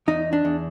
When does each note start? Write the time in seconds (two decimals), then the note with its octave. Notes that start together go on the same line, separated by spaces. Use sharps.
0.08 E2 D#4
0.33 D4
0.45 E2